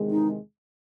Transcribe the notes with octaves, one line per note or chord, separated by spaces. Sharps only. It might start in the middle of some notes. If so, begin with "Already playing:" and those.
Already playing: E2 C3 D#3 G#3
D#4